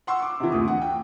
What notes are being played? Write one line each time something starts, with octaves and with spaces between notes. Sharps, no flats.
F#5 C6 C#6 E6
D6
C3 E3
D2 D#6
F#5
G5